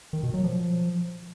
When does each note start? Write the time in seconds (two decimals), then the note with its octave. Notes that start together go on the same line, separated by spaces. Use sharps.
0.13 D#3
0.23 B2
0.34 F#3
0.44 F3